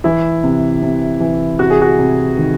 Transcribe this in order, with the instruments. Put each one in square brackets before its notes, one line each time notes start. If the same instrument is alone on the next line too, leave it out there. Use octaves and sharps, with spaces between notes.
[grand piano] E3 E4
C3
C3
E3
C3 F#4
G#4
F#4
C3
D#3